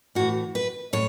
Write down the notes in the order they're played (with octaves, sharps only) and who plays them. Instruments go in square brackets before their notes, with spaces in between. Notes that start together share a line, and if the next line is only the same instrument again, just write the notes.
[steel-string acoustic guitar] A2 E3 F#4
B4
A2 C#5